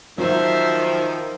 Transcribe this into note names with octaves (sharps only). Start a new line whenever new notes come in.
D#3 F3 F#3 C5 E5